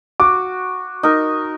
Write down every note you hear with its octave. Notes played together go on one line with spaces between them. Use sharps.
F#4 D6
D#4 A#4